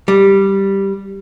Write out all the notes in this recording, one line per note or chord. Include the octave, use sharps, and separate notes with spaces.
G3